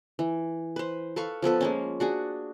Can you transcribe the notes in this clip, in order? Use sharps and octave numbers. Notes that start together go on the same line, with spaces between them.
E3
B4 C5
A4 B4 F5 C#6
F3 B3 A4 B4
G#3 A#3 C#4
D4 F#4 G#4